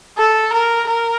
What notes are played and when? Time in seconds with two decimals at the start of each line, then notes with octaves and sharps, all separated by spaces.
0.18 A4
0.53 A#4
0.88 A#4